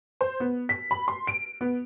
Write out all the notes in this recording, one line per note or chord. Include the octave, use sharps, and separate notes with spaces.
C5
B3
B6
B5
C6
D7
B3